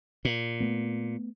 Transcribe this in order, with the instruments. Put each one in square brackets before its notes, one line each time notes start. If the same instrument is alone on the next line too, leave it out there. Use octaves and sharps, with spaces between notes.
[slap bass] A#2
[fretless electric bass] A3 B3